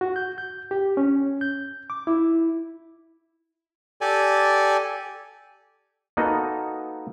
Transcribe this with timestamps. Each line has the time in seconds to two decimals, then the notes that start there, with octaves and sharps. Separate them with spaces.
0.01 F#4
0.16 G6
0.38 G6
0.71 G4
0.97 C#4
1.41 G6
1.90 D6
2.07 E4
4.01 G4 A4 D5 G#5
6.17 A#3 B3 D#4 F#4 A4 D#5